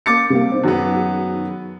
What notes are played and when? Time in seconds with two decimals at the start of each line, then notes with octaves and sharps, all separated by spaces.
0.06 A#3 C#4 D6 A6 C#7
0.30 C3 G3 A#3
0.51 D#4 C5
0.64 F#2 D#3 B3 F#4 G#4